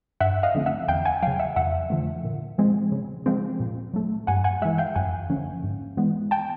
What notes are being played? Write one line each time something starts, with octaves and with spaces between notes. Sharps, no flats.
G2 E5 F#5
D#5 F5
D3 F3 A3 C4
E5 F#5
E2 F5 G5
F#5 G#5
C#3 F#3 F5 G5
E5 F#5
F2 E5 F#5
D3 F3 A3
A#2
F3 G#3 C4
C#3
F3 G#3 C4
A#2
F#3 A3
G2 F#5 G#5
F#5 G#5
E3 G#3 E5 F#5
F5 G5
F#2 F#5 G#5
D3 F3 A#3 C#4
G#2
E3 G#3 B3
G5 A5